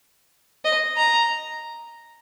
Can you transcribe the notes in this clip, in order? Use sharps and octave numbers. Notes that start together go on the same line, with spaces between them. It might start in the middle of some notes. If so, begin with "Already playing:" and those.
D#5
A#5